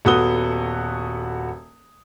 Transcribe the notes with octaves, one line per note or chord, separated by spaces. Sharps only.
D#1 B3 F#4 A4 D#6 G7